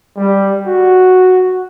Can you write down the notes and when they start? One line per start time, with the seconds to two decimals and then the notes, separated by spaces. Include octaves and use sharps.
0.17 G3
0.67 F#4